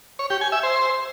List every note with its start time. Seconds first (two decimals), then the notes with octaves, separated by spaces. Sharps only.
0.19 C#5
0.30 G4
0.41 G#5
0.52 E5
0.63 C5